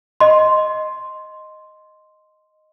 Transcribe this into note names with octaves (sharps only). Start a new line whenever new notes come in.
D#5 C6